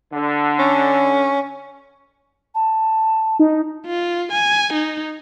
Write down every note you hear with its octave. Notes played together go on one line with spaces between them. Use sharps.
D3
C#4
A5
D#4
F4
G#5
D#4